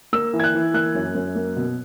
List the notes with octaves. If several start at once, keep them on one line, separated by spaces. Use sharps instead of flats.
A#3 E6
E3
G#6
F#6
E3
A#3 F#6
F#2
F#2
A#3
B2